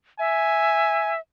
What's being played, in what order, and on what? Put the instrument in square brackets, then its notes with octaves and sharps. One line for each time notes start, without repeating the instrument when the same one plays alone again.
[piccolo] E5 [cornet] G#5